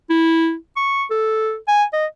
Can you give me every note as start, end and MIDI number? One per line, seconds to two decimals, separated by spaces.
0.10 0.55 64
0.76 1.04 85
1.11 1.56 69
1.68 1.84 80
1.93 2.06 75